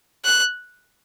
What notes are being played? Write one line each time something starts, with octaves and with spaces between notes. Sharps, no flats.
F#6